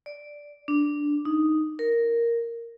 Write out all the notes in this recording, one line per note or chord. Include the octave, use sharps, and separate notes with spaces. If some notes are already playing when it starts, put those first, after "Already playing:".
D5
D4
D#4
A#4